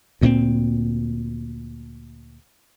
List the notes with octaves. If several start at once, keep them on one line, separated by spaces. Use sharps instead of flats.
D2 A#2 A3 C4